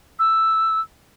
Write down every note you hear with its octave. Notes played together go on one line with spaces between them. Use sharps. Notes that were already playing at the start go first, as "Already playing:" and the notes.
E6